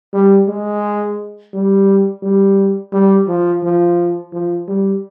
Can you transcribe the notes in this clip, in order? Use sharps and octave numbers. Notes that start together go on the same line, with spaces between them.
G3
G#3
G3
G3
G3
F3
F3
F3
G3